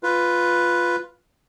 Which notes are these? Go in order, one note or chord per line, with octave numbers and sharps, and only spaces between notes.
F4 B4